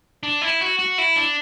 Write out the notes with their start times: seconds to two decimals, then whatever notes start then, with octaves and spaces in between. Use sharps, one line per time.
0.23 D4
0.42 E4
0.61 F#4
0.79 F#4
0.98 E4
1.16 D4